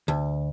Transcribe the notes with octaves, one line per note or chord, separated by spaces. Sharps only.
D2